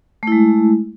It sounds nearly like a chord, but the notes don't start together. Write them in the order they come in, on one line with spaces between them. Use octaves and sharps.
A3 E4 G#3